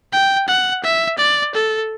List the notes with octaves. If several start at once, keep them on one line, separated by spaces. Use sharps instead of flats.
G5
F#5
E5
D5
A4